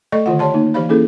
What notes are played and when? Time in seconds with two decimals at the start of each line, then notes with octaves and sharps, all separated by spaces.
0.12 A3 A4 D5 D#5 C#6
0.26 D3 D#3 F4 F#5
0.39 G4 C#5 D5 A5 C6
0.54 A#3 D#4
0.74 E3 G4 C5 D5 F5 B5
0.89 A#3 C#4 E4 G#4 A4